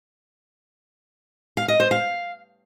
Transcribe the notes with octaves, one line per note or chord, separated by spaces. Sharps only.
F5
D#5
C5
F5